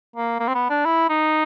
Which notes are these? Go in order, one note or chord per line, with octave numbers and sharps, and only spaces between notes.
A#3
A#3
C4
B3
D4
E4
D#4